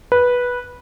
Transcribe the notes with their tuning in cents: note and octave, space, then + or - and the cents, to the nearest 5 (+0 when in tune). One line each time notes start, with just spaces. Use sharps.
B4 -10